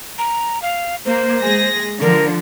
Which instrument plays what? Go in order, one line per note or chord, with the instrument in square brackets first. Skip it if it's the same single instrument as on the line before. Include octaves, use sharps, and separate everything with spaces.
[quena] A#5
F5
[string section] A#3 [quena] C5
[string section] G#3 G#4 A#6
[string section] D3 F3 [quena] A#4